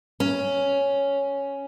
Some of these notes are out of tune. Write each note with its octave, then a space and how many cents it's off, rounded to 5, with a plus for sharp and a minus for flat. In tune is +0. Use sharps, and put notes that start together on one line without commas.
C#4 +5